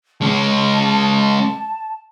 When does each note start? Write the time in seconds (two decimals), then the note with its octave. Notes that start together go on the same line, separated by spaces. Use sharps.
0.21 G#3 C#4 A5